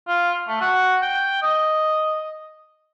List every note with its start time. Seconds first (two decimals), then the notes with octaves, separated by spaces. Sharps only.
0.08 F4
0.48 A3
0.61 F#4
1.02 G5
1.42 D#5